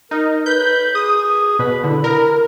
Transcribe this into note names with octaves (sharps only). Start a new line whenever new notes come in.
D#4 A#4
B4 G6
G#4 D#6
B2 B4
D3 E4
A#4